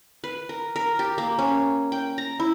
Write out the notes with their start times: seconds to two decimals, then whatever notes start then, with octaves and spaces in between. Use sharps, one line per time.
0.24 B4
0.49 A#4
0.76 A#4
0.99 G4
1.18 A#3
1.39 C#4
1.92 G5
2.18 A#5
2.40 E4